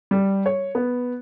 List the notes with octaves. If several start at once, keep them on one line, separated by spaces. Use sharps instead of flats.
G3
C#5
B3